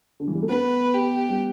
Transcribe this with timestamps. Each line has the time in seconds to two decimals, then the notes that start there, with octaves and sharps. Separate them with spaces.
0.20 D3
0.28 E3
0.35 G3
0.42 A3
0.49 B3 B4
0.94 G4
1.29 G3